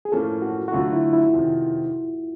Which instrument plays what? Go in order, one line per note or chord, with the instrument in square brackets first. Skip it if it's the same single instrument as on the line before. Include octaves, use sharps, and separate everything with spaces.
[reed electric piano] G#4
[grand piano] A2 F3 A#3 C#4 [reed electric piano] A4
[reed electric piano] F#4
F#4
[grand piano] D3 F#3 A3 [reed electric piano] F4
[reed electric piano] E4
E4
[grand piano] F2 C3 D#3